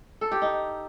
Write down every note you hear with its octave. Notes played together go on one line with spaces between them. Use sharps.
A4
G4
D#4